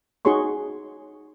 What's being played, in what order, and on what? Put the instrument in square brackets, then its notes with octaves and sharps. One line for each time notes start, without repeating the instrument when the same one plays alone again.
[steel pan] D#4 F#4 G#4 C#5 C6 C#6